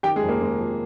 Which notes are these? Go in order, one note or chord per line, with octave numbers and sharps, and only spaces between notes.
D#3 G4 G5
G#3 G#4
F1
A#3
F1 G#3
F2